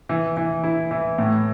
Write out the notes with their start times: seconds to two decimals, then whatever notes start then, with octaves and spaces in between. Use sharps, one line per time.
0.09 E3
0.37 E3
0.63 E4
0.91 E3
1.18 A2